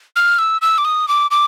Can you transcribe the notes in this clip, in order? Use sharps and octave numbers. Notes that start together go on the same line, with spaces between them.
F6
E6
E6
D6
D#6
D6
D6